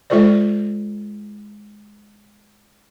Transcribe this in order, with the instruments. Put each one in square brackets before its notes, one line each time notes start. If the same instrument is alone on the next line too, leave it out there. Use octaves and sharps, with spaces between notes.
[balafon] G#3 F4 A4 C5 D5